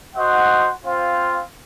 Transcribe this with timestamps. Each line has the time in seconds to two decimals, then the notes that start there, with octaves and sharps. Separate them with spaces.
0.15 F#4 C5 D#5 F#5
0.85 C4 F4 C5 F5